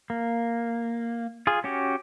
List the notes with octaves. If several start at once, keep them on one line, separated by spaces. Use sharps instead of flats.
A#3
F4 G#4
C#4 F#4 G4